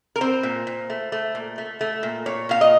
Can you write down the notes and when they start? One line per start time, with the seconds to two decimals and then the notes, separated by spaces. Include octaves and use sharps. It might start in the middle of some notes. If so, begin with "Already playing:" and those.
0.16 A#4
0.21 C4 C5
0.43 A#2
0.67 A#2
0.90 A3
1.12 A3
1.35 A#2
1.58 A3
1.81 A3
2.03 A#2
2.26 A#2 C#5
2.49 A#2 F5
2.61 D#5